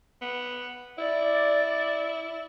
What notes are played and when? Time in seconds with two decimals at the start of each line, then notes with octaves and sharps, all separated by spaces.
0.22 B3
0.98 E4 D5